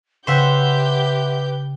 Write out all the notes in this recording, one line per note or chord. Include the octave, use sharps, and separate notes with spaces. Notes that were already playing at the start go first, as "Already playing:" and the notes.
C#3 G4 B4 C5 E5 F#5 G5 G6